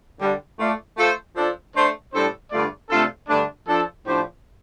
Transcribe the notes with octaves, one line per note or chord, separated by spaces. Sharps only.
D3 G3 D4
A3 F4 D5
A3 F4 A4 C5
F3 D4 A4
A3 D4 A4 C5
A2 G3 D4 A4 C5
G2 D3 A3 F4 D5
C3 A3 D4 F4 A4
G2 D3 A3 D4
F3 D4 A4
A2 F3 D4 G4 C5